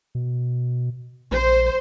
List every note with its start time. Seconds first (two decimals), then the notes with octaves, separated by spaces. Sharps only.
0.15 B2
1.31 A#1 C5